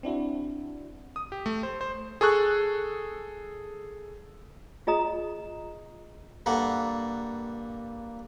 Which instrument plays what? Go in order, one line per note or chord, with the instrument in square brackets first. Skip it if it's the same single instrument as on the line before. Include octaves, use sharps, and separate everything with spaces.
[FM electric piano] C4 D4 E4 F#4
[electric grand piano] D#6
G4
A3
C5
C5
G#4 A4 C#6 F#6
[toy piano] F4 G#4 D#5 A#5 D#6
[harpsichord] G2 A#3 A4 F#5